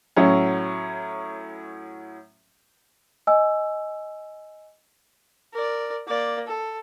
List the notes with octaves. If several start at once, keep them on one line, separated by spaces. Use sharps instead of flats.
A2 F#3 C#4
D#5 G#5 E6
A#4 D5
A#3 D5
A4